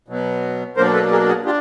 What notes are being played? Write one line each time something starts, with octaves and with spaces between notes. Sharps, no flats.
B2 F#3 B3
B2 F#3 A#3 D4 A#4 C5
A4 B4
G#4 A#4
F#4 G#4
D4 F4 G4